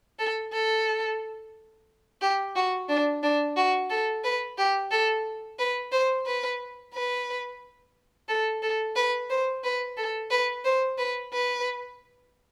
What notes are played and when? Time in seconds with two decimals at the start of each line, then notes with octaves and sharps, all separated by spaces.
0.19 A4
0.53 A4
2.22 G4
2.56 F#4
2.89 D4
3.23 D4
3.57 F#4
3.90 A4
4.24 B4
4.58 G4
4.92 A4
5.59 B4
5.93 C5
6.26 B4
6.94 B4
8.29 A4
8.63 A4
8.96 B4
9.30 C5
9.64 B4
9.98 A4
10.31 B4
10.65 C5
10.98 B4
11.33 B4